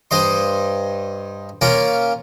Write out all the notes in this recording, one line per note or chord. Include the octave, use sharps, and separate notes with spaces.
G2 C5 D#5 C6
A#3 C#4 F4 A#4